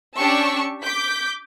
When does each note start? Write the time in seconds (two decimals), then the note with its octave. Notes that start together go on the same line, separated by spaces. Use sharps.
0.16 C#4 D4 G4 A5 C#6 E6
0.83 D6 G6 B6